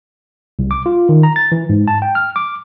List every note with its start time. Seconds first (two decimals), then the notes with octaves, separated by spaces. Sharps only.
0.59 C2
0.71 D6
0.86 F4
1.09 D#3
1.23 A#5
1.36 A6
1.52 E3
1.69 G#2
1.88 A5
2.02 G5
2.15 F6
2.36 D6